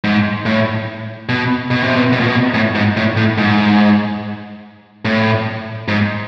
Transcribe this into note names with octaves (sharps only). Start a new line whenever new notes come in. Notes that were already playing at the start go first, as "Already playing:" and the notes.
G#2
A2
B2
B2
C3
B2
B2
A#2
B2
A2
G#2
A2
A2
G#2
A2
G#2